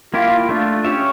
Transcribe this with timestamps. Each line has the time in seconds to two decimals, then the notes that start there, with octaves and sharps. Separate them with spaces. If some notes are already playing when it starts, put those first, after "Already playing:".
0.14 A#3 E4 F4 G4
0.49 A3 D4 F4
0.84 C#4 G4 C#5 E5